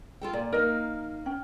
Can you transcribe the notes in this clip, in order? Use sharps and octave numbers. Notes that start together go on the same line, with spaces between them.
F4 A4 G5
A#2 D5
A#3 D#4 A#4 D#5
C#4 G5